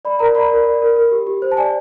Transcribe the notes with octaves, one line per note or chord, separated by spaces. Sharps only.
D5 B5
A#4 A#5
D5 B5
A#4
D5
A#4
A#4
G4
G4
C5
A5
D5 G#5